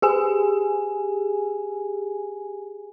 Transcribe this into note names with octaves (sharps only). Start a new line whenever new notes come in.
G4 G#4 G#5